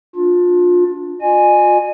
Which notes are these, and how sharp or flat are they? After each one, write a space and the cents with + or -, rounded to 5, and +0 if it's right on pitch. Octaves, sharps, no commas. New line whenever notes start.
D4 +0 F4 +25
F4 +40 D#5 -40 G#5 +0